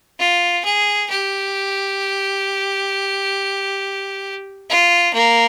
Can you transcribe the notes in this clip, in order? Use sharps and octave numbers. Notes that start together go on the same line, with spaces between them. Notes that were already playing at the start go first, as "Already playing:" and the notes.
F4
G#4
G4
F4
A#3